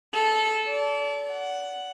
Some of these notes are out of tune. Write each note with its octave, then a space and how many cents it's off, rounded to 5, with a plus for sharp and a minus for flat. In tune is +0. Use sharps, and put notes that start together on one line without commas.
A4 -15
D5 -35
F#5 +5